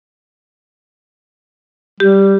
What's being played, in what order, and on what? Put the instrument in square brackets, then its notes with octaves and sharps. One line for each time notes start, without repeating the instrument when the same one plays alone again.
[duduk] G3 [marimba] G4